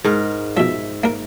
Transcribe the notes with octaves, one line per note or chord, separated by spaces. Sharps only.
G#2 A#4
B2 F3 E5
A#3 A#4